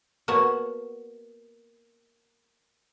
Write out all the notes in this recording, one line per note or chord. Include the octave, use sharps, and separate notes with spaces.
A#3 B3 F#4 C#5 F#5 A5